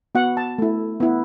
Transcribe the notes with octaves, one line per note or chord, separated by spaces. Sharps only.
B3 F#4 F#5
A5
A3 E4
B3 E4